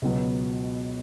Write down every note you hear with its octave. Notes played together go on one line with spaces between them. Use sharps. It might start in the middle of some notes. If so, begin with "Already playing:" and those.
C#2 B2 F#3 B3